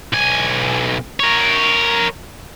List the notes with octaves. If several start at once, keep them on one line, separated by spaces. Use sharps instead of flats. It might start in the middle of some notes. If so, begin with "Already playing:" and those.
B1 G#5
A#4 C#5